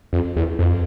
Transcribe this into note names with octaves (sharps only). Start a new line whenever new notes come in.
F2
E2
F2